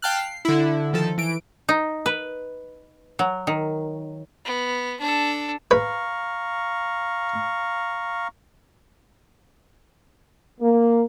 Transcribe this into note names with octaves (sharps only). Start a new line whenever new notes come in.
F5 G5 A5 F6 F#6
C7
D3 E4
D#3 F3 A4
E3 D7
D#4
B4
F#3
D#3
B3
D4 A4
B4 F5 A#5 C#6
A#3